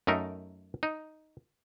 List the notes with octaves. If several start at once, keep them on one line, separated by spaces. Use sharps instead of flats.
F#2 A3 D#4 A#4
D#4